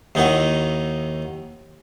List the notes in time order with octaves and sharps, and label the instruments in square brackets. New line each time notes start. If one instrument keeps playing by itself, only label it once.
[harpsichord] D#2 D#3 D#4 E4 F#4